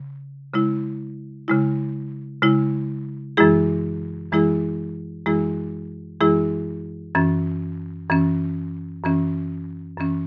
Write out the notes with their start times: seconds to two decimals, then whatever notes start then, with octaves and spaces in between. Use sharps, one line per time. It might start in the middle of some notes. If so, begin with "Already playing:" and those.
Already playing: C#3
0.54 C#3 G#3 E4
1.48 C#3 G#3 E4
2.42 C#3 G#3 E4
3.37 F#2 E3 G#3 E4 G#4
4.32 F#2 E3 G#3 E4 G#4
5.26 F#2 E3 G#3 E4 G#4
6.21 F#2 E3 G#3 E4 G#4
7.15 F#2 E3 C#4
8.09 F#2 E3 C#4
9.04 F#2 E3 C#4
9.98 F#2 E3 C#4